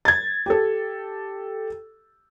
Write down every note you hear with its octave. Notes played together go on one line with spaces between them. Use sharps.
G#6 A6
G4 A4